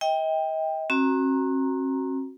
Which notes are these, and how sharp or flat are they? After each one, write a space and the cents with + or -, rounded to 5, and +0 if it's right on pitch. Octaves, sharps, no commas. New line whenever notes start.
D#5 +40 G5 +15
C4 +45 F#4 +0 A#5 +0